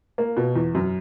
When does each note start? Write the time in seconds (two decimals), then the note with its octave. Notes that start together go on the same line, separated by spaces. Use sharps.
0.18 A#3
0.37 B2
0.56 E2
0.75 F#2